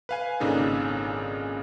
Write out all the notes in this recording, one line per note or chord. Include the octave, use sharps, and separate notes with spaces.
B4 F5 G#5
G#1 A#2 C#3 D4 D#4 A4